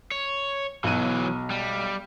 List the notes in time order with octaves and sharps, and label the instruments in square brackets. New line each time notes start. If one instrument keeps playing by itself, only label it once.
[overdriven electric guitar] C#5
[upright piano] B1 D#7 [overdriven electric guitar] E3 F#3
[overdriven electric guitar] G3